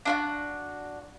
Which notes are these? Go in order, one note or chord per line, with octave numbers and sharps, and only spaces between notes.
D4 F4 F#4